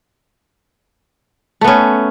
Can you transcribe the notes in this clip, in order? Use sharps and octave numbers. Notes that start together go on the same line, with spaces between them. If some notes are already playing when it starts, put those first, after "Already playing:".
A3 B3 C#4